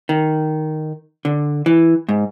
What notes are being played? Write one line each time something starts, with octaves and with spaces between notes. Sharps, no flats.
D#3
D3
E3
G#2